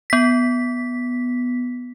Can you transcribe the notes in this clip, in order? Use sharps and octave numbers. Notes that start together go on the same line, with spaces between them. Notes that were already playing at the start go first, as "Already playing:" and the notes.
B3 B6